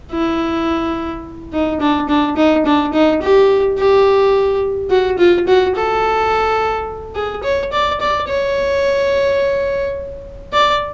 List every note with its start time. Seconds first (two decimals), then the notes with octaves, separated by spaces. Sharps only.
0.11 E4
1.53 D#4
1.80 D4
2.09 D4
2.36 D#4
2.66 D4
2.93 D#4
3.22 G4
3.78 G4
4.90 F#4
5.18 F4
5.47 F#4
5.75 A4
7.15 G#4
7.43 C#5
7.72 D5
8.00 D5
8.28 C#5
10.53 D5